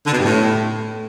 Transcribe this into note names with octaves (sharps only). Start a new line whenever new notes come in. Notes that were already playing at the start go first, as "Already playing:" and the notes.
D3
B2
G2
A2